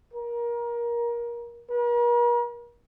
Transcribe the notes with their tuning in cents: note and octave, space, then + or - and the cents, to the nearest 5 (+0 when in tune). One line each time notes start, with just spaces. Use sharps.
A#4 +25
A#4 +45